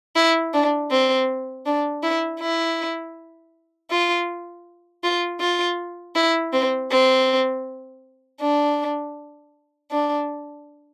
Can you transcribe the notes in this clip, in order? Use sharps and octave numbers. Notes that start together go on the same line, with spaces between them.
E4
D4
C4
D4
E4
E4
F4
F4
F4
E4
C4
C4
D4
D4